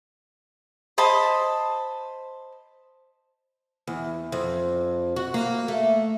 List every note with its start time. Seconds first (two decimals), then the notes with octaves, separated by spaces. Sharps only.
0.98 C5 D#5 A5 B5
3.87 E2
4.32 F2
5.16 F#4
5.34 A#3
5.68 A3